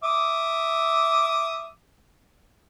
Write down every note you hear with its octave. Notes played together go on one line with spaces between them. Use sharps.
E5 D6 D#6